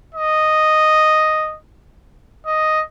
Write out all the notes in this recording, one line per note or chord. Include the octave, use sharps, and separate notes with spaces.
D#5
D#5